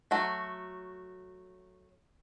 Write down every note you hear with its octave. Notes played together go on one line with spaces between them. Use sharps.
F#3 A3 F#4